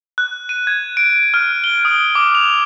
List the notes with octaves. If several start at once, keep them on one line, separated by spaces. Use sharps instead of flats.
F#6
D#7
G#6
D7
F6
G7
D#6
D6
F7